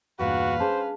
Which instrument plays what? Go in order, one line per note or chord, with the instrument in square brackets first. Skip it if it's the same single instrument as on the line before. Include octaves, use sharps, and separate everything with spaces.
[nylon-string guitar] E2 G2 A#2 [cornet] F#4 [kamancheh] B4 F5
[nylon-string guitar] C#4 [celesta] G#4 A5 [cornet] C5